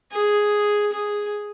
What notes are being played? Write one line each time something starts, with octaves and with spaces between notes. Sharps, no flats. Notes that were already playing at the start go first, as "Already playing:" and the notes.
G#4
G#4